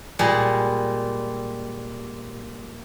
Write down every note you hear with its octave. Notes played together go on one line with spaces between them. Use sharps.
A#2 G3 G#3